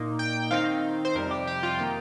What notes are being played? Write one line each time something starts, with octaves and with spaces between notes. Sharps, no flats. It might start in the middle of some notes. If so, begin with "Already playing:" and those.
Already playing: A#2 A#3 D#4
G5
D#3 C4 D#4 F5
C5
F2 C3 G3 A#4
G4
G4
F4
D#3 A#3 D#4 G4